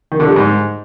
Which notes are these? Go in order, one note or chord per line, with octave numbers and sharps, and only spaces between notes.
D#3
D3
G3
G#2